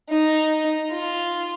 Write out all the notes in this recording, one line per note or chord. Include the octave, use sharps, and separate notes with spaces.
D#4
F4